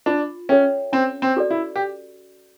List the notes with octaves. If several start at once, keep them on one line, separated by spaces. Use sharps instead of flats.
D4 F4
C#4 A4 C#5 E5 G5
C4 C#4
C4
F#4 A4 D5
E4
G4